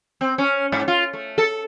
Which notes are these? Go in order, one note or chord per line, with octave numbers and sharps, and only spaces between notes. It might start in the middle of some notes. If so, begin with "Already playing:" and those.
C4
C#4
G#2
F4
A3
A4